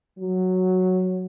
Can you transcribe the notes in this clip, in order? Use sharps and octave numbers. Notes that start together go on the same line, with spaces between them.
F#3